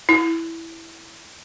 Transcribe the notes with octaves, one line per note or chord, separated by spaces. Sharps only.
E4